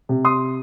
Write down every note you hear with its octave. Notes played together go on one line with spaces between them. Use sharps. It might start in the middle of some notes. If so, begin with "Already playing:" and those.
C3
C6 D#6